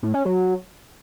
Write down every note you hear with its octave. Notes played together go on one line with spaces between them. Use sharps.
A2
C#4
F#3